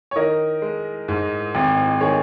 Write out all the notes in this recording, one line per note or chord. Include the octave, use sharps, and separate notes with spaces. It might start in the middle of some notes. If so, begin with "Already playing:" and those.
C#5
D#3 A#4 D#5
G#3
G#2
G#1
D#3 G#4 C#5